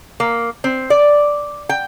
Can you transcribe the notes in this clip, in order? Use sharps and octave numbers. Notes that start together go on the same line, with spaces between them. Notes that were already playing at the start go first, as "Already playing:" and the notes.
A#3
C4
D5
G5